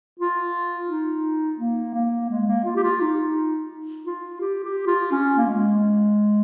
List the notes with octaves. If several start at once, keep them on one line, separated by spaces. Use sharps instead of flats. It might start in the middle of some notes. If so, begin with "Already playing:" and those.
F4
D#4
A#3
A#3
G#3
A#3
F4
G4
F4
D#4
F4
G4
G4
F4
C#4
A#3
G#3